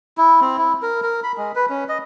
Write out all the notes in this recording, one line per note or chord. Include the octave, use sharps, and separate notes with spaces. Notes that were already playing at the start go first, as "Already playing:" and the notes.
E4
C4
E4
A#4
A#4
B5
G#3
B4
C#4
D#5